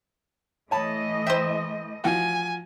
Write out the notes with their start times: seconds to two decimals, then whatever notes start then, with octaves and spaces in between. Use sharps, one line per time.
0.71 E3 A3 C#5 D#5 A5 B5
1.26 C5 E5 G5
2.04 F3 F#4 G#5